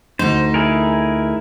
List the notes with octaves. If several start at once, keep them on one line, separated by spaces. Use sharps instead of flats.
D2 D#4 C5
E4 G#4 A#4